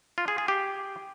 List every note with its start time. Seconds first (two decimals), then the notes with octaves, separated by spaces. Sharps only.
0.18 F4
0.28 G#4
0.38 G#4
0.48 G4